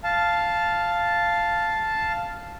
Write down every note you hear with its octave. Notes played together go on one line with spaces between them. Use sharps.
F5 A5